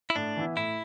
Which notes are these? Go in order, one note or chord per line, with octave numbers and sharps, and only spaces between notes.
E4
A2 D4
E3 B3 E4
A2 E4